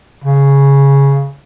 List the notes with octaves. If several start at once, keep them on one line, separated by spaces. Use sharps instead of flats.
C#3